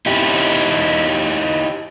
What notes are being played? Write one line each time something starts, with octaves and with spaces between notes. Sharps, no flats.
D#4 E4 G4